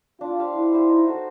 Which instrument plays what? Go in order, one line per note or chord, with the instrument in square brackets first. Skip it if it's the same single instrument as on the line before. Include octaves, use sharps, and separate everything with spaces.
[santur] D4 [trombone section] F4
[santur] G4 C5 F5
[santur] D4 [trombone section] E4
[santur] G4 C5 F5
D#4
F#4 A4